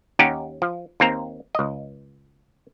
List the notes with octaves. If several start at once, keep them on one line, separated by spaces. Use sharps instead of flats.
D#2 C#4 D#4 G4 F#5
F3
D#2 A#3 C4 A#5
C#2 D#5